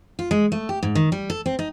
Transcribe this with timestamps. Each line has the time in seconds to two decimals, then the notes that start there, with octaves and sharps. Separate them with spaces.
0.19 F4
0.31 G#3
0.52 A3
0.69 G4
0.83 G#2
0.95 D#3
1.12 G3
1.30 A4
1.46 C4
1.59 D#4